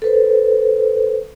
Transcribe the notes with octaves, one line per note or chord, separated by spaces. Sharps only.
A4 B4 C5